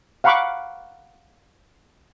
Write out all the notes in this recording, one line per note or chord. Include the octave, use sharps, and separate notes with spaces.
F5 F#5 A#5 B5 C#6 D6